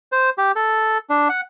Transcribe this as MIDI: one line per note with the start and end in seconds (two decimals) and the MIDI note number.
0.12 0.30 72
0.38 0.52 67
0.56 0.98 69
1.09 1.28 62
1.29 1.41 78